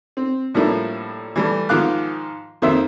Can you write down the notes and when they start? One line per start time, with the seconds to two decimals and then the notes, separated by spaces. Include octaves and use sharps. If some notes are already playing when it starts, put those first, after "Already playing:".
0.17 C4
0.54 A2 F3 G3 A#3 D4 E4
1.36 E3 G3 A3
1.69 G#2 D#3 F3 F5 D6 F#6
2.62 F2 D#3 A#3 C5 E5